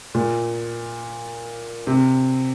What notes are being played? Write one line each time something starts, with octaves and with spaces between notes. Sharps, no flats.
A#2
C3